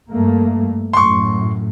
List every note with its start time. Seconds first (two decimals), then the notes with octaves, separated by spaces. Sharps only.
0.11 G2 A3 A#3
0.93 F#2 A2 C6 C#6